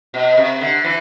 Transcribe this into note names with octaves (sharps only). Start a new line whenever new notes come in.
B2
C3
D3
E3